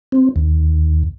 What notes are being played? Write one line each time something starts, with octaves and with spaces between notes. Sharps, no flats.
C4
D#2